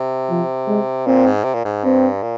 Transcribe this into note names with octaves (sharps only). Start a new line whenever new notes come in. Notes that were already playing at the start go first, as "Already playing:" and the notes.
Already playing: C3
F3
G#3
A#2 C4
G#2
C3
A#2
G#2
G2 C4
A#2